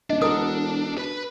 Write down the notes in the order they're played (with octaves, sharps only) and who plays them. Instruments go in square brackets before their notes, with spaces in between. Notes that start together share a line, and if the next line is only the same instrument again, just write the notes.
[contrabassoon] D#1 [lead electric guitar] D4 [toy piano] D#5
[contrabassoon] E1 [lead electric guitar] D4 [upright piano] F#4 A4 A#4 [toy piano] D#6
[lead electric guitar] B4 B5